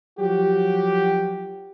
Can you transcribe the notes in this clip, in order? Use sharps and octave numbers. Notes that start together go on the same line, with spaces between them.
F3 F#3 F#4 G4